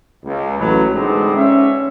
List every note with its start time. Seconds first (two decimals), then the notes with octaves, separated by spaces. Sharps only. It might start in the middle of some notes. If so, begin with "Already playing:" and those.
0.24 C#2
0.58 A1 F#3 B4
0.93 D3 G#3 B3 C4 D4 D#4
1.35 C#4 E5